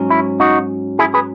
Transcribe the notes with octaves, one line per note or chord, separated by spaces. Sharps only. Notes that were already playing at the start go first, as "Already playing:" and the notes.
Already playing: G#2 F#3 C#4
E4
D#4 F#4
E4 G#4
G#4 B4